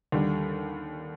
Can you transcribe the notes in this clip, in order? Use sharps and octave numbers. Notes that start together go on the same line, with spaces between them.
D#2 D3 G3